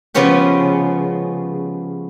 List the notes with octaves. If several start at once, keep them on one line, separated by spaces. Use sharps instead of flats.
C#3 F3 G#3 B3 C#4 G4